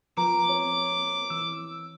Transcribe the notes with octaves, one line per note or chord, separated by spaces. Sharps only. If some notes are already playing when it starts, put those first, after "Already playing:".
F3 B4 A#5 D6
C4 C#5
E3 E6